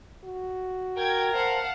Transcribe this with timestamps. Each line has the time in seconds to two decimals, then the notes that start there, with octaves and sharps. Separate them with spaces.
0.24 F#4
0.97 A#4 G5 G#6
1.34 C5 F5 F#5 A5